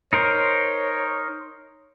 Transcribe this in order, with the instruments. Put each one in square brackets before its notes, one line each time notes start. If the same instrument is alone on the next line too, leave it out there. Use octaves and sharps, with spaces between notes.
[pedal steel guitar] D#4 A#4 C5 [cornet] C#5